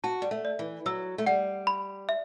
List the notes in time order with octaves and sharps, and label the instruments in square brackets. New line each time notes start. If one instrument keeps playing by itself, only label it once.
[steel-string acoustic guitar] F#4 [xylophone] A5
[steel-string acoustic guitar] G3
A3
[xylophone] D5
[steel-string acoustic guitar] E3
[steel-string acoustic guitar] F#3 [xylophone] E6
[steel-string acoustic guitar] A3
[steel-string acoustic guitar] G3 [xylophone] F#5
[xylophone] B5
E5